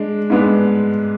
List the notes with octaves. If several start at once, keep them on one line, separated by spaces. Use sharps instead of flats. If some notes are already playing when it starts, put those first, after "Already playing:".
Already playing: G#3 D4
G#2 G#3 B3 D4